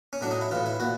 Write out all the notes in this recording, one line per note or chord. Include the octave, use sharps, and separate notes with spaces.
C#4
A2 F#3 D4
D#4
E4
A2 E3 F4
E4
A#2 F#4